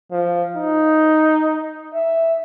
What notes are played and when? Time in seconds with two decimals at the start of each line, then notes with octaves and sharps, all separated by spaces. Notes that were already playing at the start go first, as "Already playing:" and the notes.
0.12 F3
0.56 D#4
1.94 E5